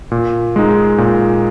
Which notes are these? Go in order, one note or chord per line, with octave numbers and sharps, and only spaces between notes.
A#2
G#3 D#4
A#2